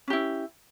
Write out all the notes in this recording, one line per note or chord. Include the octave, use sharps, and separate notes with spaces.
C#4 E4 G4